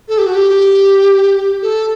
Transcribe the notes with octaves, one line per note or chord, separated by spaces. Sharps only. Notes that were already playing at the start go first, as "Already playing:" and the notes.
A4
G4
F#4
G4
A4